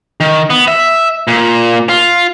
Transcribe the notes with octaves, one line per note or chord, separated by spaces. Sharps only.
D#3
B3
E5
A#2
F4